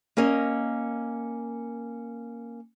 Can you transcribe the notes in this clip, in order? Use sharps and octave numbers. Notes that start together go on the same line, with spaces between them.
A#3 C#4 A#4 D#5